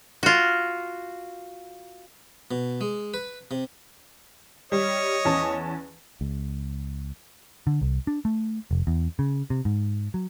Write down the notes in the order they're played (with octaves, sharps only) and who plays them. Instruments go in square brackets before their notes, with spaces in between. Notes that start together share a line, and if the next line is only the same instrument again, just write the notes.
[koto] F4 F#4
[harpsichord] B2
G#3
B4
C3
[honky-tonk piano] G3 [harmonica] C#5 D#5
[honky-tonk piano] E2 C#4 A5
[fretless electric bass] C#2
[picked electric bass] D3
C2
D4
A3
F1
E2
C#3
C3
G#2
F#3